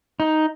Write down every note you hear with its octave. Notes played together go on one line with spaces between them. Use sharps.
D#4